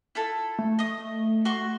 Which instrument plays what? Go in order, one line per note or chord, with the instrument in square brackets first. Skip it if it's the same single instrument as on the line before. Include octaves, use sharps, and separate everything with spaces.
[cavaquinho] E4 F4 A4
[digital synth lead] A3
[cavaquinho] D#5 D#6
F#4 C6 C#6